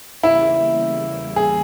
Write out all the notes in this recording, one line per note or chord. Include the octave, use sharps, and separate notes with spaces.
E2 C#3 G3 A#3 E4
G#4